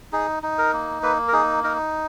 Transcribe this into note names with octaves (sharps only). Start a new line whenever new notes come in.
D#4 G#4
D#4
A#4
A#3
A#3 B4
A#4
D#4 G#4
D#4 A#4